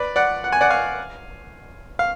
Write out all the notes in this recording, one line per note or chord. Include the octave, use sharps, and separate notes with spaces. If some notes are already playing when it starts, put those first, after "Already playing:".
Already playing: B4 D5
D5 F#5
F#5
G#5
D5 F#5
F5 G#5
F5